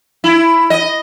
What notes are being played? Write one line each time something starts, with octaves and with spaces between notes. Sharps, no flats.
E4
D#5